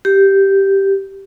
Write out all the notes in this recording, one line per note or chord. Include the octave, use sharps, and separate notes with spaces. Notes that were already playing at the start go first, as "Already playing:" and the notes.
G4